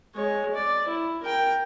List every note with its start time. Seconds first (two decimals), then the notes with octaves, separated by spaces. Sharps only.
0.15 G#3 C#5
0.55 D5
0.88 E4
1.23 A#4 G5